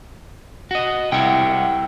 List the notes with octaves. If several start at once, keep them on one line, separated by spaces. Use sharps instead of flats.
F#4 D#5
C2 E4 F#5 G5